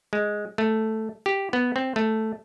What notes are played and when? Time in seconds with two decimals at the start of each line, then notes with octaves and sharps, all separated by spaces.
0.13 G#3
0.58 A3
1.26 G4
1.53 B3
1.76 C4
1.96 A3